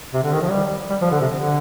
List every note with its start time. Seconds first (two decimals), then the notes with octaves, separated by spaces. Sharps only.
0.14 C3
0.23 D3
0.33 D#3
0.42 F3
0.51 G3
0.90 G3
1.01 F3
1.12 D3
1.21 C3
1.32 D3